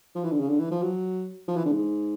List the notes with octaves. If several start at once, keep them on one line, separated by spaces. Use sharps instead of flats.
F3
E3
D3
C#3
D3
E3
F3
F#3
F3
E3
D3
G#2